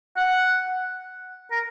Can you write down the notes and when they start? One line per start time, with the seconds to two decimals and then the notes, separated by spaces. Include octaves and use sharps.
0.17 F#5
1.51 A#4